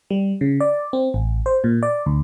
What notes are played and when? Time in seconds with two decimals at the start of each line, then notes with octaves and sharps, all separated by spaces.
0.10 G3
0.41 C#3
0.60 D5
0.93 C4
1.14 A1
1.46 C5
1.64 A#2
1.83 D5
2.06 D2